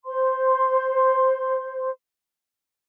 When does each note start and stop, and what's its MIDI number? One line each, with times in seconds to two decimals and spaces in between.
0.05 1.89 72
0.05 1.89 84